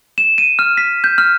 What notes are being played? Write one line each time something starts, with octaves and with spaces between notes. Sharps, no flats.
E7
D#7
F6
B6
G6
F6